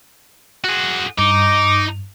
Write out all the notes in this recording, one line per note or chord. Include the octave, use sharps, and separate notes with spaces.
F#4 G#4
G2 D#4 D6